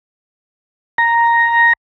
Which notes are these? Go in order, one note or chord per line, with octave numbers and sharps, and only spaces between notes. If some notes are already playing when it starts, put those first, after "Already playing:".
A#5